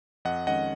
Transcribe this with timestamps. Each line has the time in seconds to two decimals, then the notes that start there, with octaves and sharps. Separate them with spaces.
0.25 F2 D#5 F#5
0.47 D#3 G#3 C#4 D#5 F#5